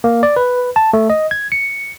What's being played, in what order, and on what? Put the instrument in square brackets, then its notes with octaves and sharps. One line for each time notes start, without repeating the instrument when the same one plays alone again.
[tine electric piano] A#3
D5
B4
A5
A3
D#5
G#6
C#7